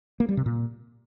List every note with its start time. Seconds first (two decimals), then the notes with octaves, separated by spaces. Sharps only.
0.20 A#3
0.29 G3
0.37 C3
0.46 A#2